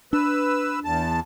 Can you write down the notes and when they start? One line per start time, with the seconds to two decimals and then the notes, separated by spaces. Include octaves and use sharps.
0.13 D4 B4 E6
0.84 E2 A5